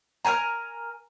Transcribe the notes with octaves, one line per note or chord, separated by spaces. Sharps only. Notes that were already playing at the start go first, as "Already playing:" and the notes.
A#4 C5 G#5 A#5